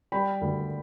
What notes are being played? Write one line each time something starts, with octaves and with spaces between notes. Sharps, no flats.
G3 G5 B5
D2